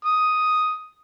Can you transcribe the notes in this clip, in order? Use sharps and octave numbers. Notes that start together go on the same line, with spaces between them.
D#6